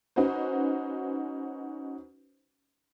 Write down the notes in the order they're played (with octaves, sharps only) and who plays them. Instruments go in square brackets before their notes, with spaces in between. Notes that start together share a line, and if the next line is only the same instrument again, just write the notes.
[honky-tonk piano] C#4 D#4 F#4 B4 C5